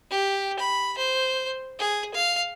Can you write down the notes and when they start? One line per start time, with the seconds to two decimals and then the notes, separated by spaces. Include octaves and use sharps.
0.10 G4
0.59 B5
0.98 C5
1.79 G#4
2.14 F5